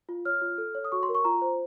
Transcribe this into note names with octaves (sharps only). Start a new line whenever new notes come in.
F4
C#5 F6
F4
A4
C#5
D#6
F#4 C#6
C6
A#4
C#6
F4 A#5
C5